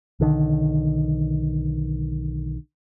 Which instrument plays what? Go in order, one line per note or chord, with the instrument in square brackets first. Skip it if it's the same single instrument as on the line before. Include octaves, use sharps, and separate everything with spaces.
[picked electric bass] B1 D3 D#3